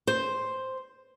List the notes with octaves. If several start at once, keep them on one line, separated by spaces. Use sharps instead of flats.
C5